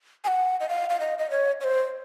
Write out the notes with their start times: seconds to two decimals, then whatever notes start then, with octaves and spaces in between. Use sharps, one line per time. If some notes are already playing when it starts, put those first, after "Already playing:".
0.24 G#5
0.28 F#5
0.60 D#5
0.69 F5
0.90 F5
1.00 D#5
1.18 D#5
1.31 C#5
1.60 C#5
1.64 C5